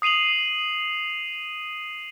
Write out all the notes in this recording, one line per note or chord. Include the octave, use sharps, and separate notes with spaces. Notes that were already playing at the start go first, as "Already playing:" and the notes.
D#6 C7 D#7 F7 F#7